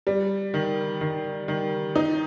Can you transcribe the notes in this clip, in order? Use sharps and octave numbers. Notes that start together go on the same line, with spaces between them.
G3
D#3
D#3
D#3
D#4